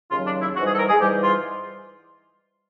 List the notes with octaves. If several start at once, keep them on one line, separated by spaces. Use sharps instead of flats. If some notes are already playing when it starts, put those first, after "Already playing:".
D#2 C#3 F#3 F4
D4
E4
G#2 E3 G3 F#4
G#4
A4
A#4
G#4
G#2 E3 G3 G4
F4